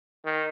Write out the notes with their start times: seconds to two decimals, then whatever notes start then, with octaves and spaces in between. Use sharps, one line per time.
0.25 D#3